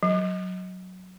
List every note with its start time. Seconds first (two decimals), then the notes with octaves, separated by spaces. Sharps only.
0.03 F#3